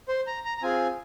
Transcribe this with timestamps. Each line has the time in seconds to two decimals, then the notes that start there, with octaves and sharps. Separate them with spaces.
0.08 C5
0.27 A#5
0.45 A#5
0.58 A#5
0.62 C4 F4 G#4 G#5